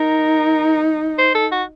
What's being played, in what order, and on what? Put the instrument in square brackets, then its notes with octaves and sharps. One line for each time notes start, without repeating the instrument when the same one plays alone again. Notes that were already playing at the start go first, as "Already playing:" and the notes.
Already playing: [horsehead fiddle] D#4 [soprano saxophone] A#4
[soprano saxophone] C5
A4
F#4